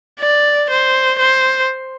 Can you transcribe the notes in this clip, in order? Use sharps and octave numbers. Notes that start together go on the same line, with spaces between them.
D5
C5
C5